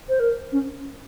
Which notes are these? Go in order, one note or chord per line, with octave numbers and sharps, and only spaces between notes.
C5
A#4
C#4